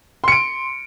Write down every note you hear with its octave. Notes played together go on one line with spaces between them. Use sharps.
C6 C#7 D7